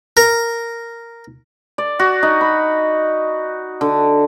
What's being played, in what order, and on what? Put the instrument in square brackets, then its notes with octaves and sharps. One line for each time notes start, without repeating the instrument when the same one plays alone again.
[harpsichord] A#4
[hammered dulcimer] D5
F#4
D#4
B5
D3